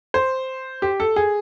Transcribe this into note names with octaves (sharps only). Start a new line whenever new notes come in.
C5
G4
A4
G#4